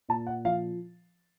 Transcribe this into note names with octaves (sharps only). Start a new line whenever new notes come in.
A#2 A5
F#5
F3 F5